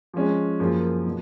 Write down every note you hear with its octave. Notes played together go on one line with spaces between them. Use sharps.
F3 G#3 C#4
F#2 F3 A#3 F4 G#4
B2 F#3